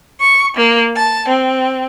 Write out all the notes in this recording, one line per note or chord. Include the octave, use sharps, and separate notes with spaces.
C#6
A#3
A5
C4